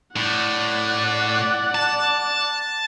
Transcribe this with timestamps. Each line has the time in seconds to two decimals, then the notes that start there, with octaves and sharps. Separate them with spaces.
0.16 A2 D5 F#5
1.75 A5